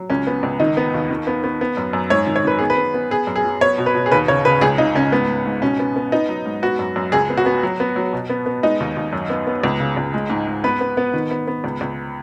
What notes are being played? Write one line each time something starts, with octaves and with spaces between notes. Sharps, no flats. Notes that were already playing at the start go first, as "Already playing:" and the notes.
Already playing: F#3
C#2 C#4
B3
C#2
D#3 D#4
B3
D#2
D#3
B3
B3
B3
F#2
F#2
G#2 C#5
D#3
C#5
D#3 B4
B3 G#4
B4
B3
B3
B3 G#4
F#2
G#4
F#3
B3 C#5
B2
B4
B2
G#4
D#2 B4
C#3 C#5
C#3 B4
C#2 G#4
C#3 D#4
C#2 C#4
G#2 B3
G#2
G#2
B2 C#4
B3
B3
B3 D#4
F#3
G#2
B3 F#4
F#2
F#2
C#2 G#4
B3
F#4
B3
F#3
B3
F#3
B2
B3
B3
G#3 D#4
D#2
D#2
F#2
B3
B3
C#2
C#3
C#2
G#3
G#2
G#2
B3 B4
B3
B3
D#3
B3
B3
C#2
C#2